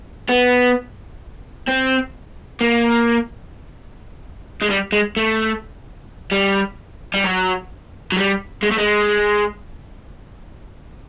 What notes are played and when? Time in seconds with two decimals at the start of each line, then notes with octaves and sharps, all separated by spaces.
0.29 B3
1.68 C4
2.61 A#3
4.62 G#3
4.70 G3
4.92 G#3
5.17 A3
6.32 G3
7.14 G3
7.24 F#3
8.12 F#3
8.17 G3
8.63 G#3
8.71 A3
8.78 G#3